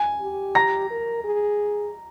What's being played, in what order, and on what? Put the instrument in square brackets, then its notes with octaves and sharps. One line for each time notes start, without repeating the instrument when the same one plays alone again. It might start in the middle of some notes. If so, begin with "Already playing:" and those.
Already playing: [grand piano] G#5
[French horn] G4
[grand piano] A#5 A#6
[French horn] A#4
G#4